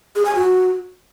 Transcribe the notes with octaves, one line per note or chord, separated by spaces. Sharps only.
G#4
G#5
F#4